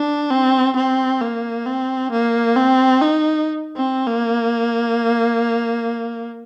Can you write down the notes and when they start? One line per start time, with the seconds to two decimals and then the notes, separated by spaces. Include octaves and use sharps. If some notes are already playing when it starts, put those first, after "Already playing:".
Already playing: D4
0.31 C4
0.76 C4
1.21 A#3
1.66 C4
2.12 A#3
2.56 C4
3.01 D#4
3.76 C4
4.07 A#3